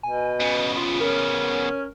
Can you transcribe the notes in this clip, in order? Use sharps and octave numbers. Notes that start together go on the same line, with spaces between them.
B2 G#5
C#3 B3
F4
C#4 A#4